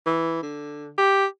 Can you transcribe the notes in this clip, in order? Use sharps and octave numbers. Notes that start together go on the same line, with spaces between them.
E3
D3
G4